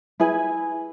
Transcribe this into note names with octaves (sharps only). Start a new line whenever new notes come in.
E4 G#4 B4 G#5